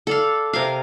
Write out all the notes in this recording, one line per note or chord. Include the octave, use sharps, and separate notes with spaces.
A4 D5 F5
C3 A#4 F5